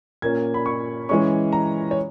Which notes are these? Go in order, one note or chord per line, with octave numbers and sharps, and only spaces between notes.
A#2 A#3 C#4 G#6
B5
C#6
E3 G#3 C#4 C#6
A#5
C#5